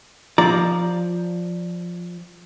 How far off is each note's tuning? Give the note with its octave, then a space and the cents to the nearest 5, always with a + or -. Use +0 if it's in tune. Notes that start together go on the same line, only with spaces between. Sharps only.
F3 +5 D5 +0 A#5 +0